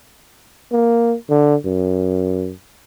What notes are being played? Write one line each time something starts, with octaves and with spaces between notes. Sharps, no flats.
A#3
D3
F#2